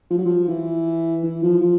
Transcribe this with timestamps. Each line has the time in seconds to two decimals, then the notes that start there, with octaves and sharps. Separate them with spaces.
0.10 F3
0.18 F#3
0.26 F3
0.48 E3
1.23 E3
1.43 F3
1.62 F3